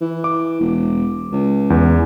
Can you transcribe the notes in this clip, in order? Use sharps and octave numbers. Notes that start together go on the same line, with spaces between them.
E3
D6
E1
C#2
E2